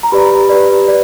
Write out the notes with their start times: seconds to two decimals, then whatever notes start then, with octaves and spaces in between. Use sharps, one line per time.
0.03 A#5
0.12 G4 B4 D5 B5
0.49 G4 B4 D5
0.88 B4 D5